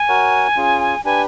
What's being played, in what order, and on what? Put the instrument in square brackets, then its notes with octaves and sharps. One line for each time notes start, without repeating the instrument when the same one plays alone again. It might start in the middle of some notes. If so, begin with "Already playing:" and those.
Already playing: [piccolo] G#5
[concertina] F#4 A#4 C#5 F#5
C#4 F4 G#4
[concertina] D4 G4 B4 [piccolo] G#5